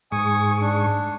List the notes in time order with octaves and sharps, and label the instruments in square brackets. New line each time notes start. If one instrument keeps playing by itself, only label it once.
[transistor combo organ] G#2 C#6 [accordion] G#5 D#6
[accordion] D4